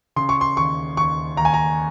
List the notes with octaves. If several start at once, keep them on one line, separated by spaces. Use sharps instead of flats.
C#3 C6
C#6
C6
D#2 C#6
D#2 C#6
D#2 A#5
G#5
A#5